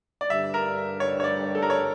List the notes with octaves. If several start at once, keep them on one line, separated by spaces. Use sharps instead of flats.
D5
G2 D3 G3 E5
A#4
C#5
C#5
D5
A4
A#4
C#5